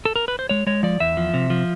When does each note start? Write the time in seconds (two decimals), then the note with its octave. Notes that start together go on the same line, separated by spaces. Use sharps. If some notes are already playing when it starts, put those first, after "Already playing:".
0.05 A4
0.16 A#4
0.28 B4
0.39 C5
0.49 G#3 C#5
0.67 G#3 C#5
0.83 F3 D5
1.00 E2 E5
1.17 F3
1.34 C3
1.50 F3